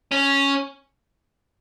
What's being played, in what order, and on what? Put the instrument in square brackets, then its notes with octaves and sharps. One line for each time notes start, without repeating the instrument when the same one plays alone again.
[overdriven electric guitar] C#4